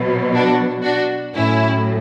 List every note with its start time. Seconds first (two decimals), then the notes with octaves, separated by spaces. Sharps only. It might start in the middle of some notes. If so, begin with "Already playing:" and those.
Already playing: B2 F#3
0.34 D4 F#4
0.84 D4 F#4
1.35 A2 F#3 C#4 E4